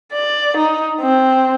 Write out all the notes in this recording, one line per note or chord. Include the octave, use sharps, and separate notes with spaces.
D5
D#4
C4